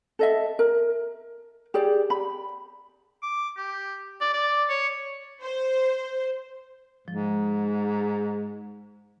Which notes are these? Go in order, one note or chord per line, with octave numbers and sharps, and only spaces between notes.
A4 D#5 E5
A#4
G4 G#4 D5
B5
D6
G4
D5
D5
C#5
C5
G#2 F3